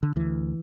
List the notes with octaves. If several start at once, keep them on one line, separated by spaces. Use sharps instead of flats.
D3
D2 E3